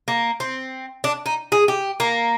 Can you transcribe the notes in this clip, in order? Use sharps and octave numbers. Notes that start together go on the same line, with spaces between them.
A#3
C4
D4
D#4
G#4
G4
A#3